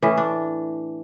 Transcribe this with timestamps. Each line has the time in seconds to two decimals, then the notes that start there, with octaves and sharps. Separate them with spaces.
0.02 A2 E3 C#4
0.17 D4